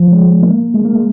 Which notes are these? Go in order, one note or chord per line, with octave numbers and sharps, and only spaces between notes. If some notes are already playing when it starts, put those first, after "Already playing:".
Already playing: F3
G#3
A#3
G#3
A#3
G#3